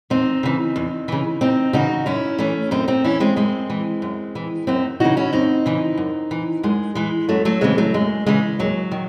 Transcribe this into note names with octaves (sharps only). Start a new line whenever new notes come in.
E2 C4 D#4
C#3 E3
E2
C#3 E3
E2 C4 D#4
C#3 E3 D#4 F#4
F#2 C#4 E4
E3 A3 C#4
F#2 C4 D#4
C4 D#4
E3 C#4 E4
G#3 C4
F#2 G#3 C4
E3
F#2
E3
F#2 C4 D#4
C#3 E3 D#4 F#4
C#4 E4
F#2 C4 D#4
C#3 E3
F#2
E3
F#2 G#3
E3 G#3
F#2 F#3 A3
F#3 A3
C#3 E3 G#3 C4
F#3 A3
F#2 G#3
C#3 E3 G#3
D#2 F#3
D#3